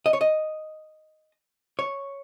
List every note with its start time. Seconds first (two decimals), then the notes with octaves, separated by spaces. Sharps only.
0.06 D#5
0.13 C#5
0.21 D#5
1.79 C#5